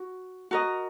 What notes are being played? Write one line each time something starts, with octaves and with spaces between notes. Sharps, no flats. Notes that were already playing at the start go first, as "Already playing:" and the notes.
Already playing: F#4
F#4 A#4 D#5